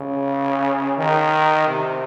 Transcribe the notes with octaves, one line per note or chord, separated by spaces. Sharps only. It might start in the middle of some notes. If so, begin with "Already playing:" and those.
Already playing: C#3
D#3
C3